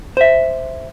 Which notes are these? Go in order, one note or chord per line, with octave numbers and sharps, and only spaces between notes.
C5 E5